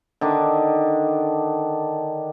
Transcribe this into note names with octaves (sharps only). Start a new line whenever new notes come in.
D3 D#3 D4